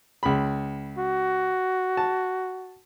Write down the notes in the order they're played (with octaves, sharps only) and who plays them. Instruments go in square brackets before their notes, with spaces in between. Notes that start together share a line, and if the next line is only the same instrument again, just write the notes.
[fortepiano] C#2 B5
[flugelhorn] F#4
[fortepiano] A5